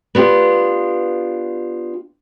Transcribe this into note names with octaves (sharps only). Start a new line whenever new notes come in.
B3 D4 F4 G4